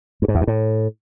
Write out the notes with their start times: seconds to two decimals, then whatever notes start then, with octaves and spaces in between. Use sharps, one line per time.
0.22 G2
0.28 G#2
0.35 E2
0.41 G2
0.47 A2